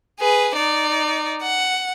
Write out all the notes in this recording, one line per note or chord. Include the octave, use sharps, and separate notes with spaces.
G#4 B4
D#4 D5
F#5